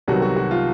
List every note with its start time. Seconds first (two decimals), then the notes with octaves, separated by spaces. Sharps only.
0.08 C2 C3 D#3 F#3 B3 F#4
0.22 F#4
0.36 F#4
0.51 F4